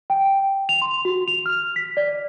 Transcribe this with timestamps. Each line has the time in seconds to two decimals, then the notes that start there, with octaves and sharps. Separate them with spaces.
0.10 G5
0.69 F7
0.82 C6
1.05 F#4
1.28 F7
1.46 F6
1.76 B6
1.97 D5